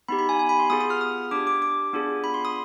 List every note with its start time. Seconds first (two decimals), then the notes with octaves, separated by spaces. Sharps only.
0.08 B3 D#4 G4 B5
0.19 B5
0.29 G#5
0.39 G#5
0.49 B5
0.60 C6
0.70 B3 F4 G#4 D#6
0.80 D#6
0.90 F6
1.01 D#6
1.31 D4 G4 D6
1.47 D6
1.62 D6
1.93 B3 D4 F4 G#4
2.24 B5
2.34 C6
2.45 D#6